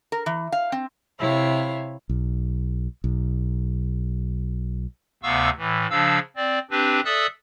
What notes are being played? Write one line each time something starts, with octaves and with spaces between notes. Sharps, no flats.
A#4
E3
F5
C4
C3 E4 C#5 F5
B1
B1
D2 C3 B3 F5 C#6 E6
A2 E3
C#3 F3 D4 F5 E6
C4 D5
C4 D4 G4 B4
A4 D5 E5 D#6 E6 F#6